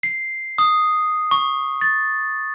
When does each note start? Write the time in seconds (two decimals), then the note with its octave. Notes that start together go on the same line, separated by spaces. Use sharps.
0.03 C7
0.58 D#6
1.31 C#6
1.81 A6